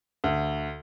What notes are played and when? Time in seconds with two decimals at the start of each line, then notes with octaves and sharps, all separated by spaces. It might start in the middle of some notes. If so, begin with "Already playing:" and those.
0.24 D2